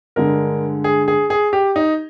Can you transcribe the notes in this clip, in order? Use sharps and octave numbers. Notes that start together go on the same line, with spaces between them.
G2 D3 G#3 A#4
G#4
G#4
G#4
G4
D#4